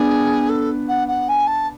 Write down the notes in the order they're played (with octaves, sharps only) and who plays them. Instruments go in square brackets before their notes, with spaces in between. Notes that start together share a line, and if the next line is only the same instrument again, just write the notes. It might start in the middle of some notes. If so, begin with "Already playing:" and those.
Already playing: [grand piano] B3 D4 [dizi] G#4
[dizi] A4
F#5
F#5
G#5
A5